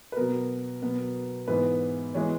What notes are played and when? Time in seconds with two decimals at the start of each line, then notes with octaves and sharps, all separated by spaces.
0.12 B4
0.16 B2 F#3 B3 A#4
0.82 B2 F#3 B3
1.48 G#2 E3 B3 B4
2.15 E3 G#3 B3 C#5